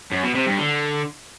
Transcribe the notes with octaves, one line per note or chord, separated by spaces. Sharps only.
F#2
B2
C3
G2
D3